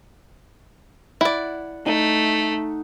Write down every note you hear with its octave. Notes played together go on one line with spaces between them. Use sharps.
E4 D5 F#5
A3 D#4